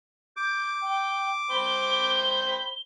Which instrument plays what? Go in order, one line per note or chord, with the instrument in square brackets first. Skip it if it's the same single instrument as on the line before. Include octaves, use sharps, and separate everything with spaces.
[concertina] D6 [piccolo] G6
[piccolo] G5
[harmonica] C5 G5 B5 [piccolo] G7